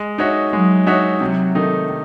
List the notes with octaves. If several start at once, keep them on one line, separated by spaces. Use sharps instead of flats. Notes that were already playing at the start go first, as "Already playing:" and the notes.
Already playing: G#3
D#4 F#4 C#5 E5
F#3 G#3
D#4 F#4 C#5 E5
C3 F#3
D#3 A3 D#4
C3